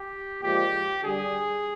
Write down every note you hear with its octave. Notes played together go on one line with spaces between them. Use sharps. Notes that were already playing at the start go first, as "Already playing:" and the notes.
Already playing: G4
A#2 F3 G#3 G4
D3 G3 G#4